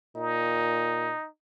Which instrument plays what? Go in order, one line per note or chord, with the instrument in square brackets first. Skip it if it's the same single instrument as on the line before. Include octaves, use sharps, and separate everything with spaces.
[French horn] A#2 [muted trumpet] D#4